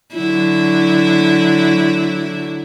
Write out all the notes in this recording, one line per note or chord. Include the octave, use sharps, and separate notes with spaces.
D3 F#3 E4